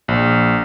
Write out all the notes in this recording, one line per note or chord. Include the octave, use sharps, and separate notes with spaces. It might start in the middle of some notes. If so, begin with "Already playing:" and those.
A#1